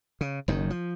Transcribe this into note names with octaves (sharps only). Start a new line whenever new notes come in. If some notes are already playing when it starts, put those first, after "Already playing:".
C#3
F#1 F#2 D#3
F3